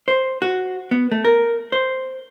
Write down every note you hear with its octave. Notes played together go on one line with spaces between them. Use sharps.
C5
F#4
B3
A3
A#4
C5